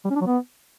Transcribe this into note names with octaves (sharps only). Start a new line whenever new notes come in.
G3
C#4
D4
F#3
B3